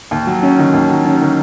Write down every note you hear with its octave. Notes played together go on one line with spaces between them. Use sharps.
D#2
F#3
C#4
D#3
D#2
F#3
C#4
D#3